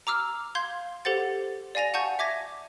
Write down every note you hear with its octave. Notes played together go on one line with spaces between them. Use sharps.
A#5 D6 E6 F6
F5 C6 G6 G#6
G4 A4 C5 F#5 A6
D5 F5 G#5 A#6 F7
F#5 G#5 A5 C#6 G6
E5 D6 G#6 A#6